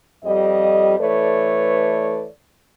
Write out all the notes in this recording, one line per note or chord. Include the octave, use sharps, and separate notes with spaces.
F2 G3 D#5
E3 A3 A4 B4 C#5 D5